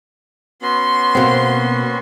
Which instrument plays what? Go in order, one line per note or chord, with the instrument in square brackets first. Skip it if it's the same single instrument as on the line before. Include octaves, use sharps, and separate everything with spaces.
[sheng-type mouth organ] B3 C#4 F#4 [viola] C6
[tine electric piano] B2 F#5 [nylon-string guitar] A#3 C4